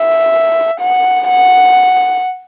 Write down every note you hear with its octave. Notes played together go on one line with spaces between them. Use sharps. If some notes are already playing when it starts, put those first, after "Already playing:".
Already playing: E5
F#5
F#5